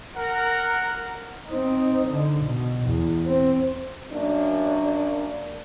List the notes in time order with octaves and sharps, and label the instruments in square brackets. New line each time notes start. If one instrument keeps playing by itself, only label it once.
[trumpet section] A#4 F#5
[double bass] C4 D#4
D3
B2
E2
C4
[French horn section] F#2 A#3 D4